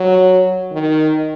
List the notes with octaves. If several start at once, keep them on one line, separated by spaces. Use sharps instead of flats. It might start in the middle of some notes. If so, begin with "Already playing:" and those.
Already playing: F#3
D#3